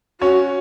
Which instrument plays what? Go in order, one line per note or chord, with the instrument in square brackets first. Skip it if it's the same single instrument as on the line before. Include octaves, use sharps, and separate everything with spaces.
[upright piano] C#4 C#5 [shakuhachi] F#4